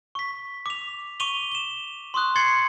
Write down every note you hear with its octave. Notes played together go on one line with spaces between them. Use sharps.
C#6 B6
D6 F7
C#6 D6 D#7 F7 G7
E7 G7
C6 C#6 D#6 F#6
C6 C#6 G#6 A6 C7 C#7